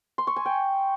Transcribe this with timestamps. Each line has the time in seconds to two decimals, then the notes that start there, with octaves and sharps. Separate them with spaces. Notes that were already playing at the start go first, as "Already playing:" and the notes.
0.18 C6
0.27 C#6
0.36 G#5
0.45 G5